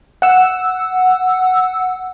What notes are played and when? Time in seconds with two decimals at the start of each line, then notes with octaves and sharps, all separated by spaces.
0.22 F#5 E6